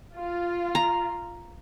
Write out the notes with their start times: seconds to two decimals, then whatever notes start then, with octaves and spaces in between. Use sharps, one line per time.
0.15 F4
0.75 A#5